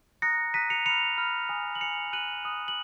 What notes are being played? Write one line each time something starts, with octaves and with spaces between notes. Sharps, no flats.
A#5 D#6 F#6 A#6 C#7
A#5 D#6 F#6 B6 D#7
C#7 F7
B5 F6 C#7 F7
B5 F6
G#5 D#6 F#6
F#7
G#5 D#6 F#6 C#7 F7
B5 D#6 F#6 D#7 F#7
B5 D#6 F#6
F#7